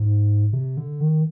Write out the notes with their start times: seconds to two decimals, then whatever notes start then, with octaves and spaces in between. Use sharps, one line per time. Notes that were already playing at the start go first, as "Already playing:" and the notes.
Already playing: G#2
0.53 C3
0.77 D3
1.00 D#3